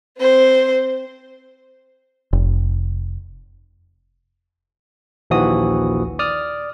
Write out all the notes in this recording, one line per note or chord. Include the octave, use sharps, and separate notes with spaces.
C4 C5
F1
A#1 D#2 E3 F3 F#4 D#6
D5 D#6 F6